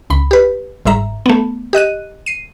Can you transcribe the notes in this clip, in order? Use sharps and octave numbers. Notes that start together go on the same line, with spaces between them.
C#2 B5
G4 B4
G1 G#2 E5 A#5
A3 B3
G4 D#5 F#6 D#7
C7 D#7